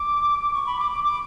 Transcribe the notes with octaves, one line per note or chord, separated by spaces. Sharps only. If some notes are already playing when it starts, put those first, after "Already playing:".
Already playing: D6
C#6
B5
D6
D6
D6